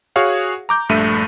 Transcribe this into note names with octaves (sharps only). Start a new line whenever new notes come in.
F#4 G#4 C#5 F5 F#5
A#5 D6 G6
A#1 G2 A3 E5 D#7